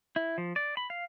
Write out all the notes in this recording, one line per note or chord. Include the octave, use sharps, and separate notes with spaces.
E4
F3
D5
B5
F5